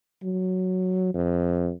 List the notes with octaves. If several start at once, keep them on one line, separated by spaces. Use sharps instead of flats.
F#3
F2